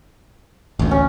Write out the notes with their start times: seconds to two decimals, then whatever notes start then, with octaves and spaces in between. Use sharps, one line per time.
0.79 A1 D2
0.91 C#4